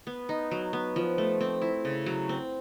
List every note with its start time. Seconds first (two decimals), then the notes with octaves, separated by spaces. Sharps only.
0.07 B3
0.29 D#4
0.51 F#3
0.73 B3
0.96 F3
1.18 A3
1.41 C4
1.62 E4
1.85 C#3
2.06 F#3
2.29 C4